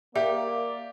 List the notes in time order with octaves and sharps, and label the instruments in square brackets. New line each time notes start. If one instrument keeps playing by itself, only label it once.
[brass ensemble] A#3 [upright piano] G4 [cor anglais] D5 [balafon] E5